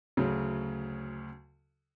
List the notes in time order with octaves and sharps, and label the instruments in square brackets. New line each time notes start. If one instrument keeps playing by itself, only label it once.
[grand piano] D2 C#3 F#3